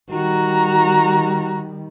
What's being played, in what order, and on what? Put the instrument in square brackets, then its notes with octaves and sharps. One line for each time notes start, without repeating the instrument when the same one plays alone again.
[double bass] D#3 G3 [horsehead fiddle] F#4 A#5